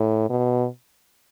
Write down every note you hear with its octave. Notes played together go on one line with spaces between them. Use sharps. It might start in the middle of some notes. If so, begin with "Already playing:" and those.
Already playing: A2
B2